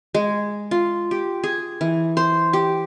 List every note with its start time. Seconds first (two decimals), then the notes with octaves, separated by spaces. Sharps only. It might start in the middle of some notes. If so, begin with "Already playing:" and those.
0.15 G#3
0.71 F4
1.11 G4
1.44 G#4
1.81 E3
2.17 C5
2.53 G4